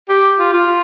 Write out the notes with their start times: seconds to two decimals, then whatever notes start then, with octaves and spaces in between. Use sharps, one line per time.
0.09 G4
0.39 F4
0.53 F4